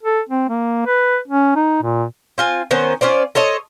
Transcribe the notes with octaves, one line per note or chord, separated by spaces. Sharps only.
A4
C4
A#3
B4
C#4
D#4
A#2
C4 F4 G#5
D#3 B3 C#4 C5
C#4 F4 C5 D5
A4 C5 C#5 D#5